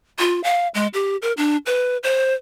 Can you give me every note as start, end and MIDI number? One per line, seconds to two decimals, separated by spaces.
0.19 0.43 65
0.44 0.68 77
0.74 0.87 56
0.94 1.16 67
1.22 1.32 70
1.37 1.57 62
1.66 1.97 71
2.03 2.34 72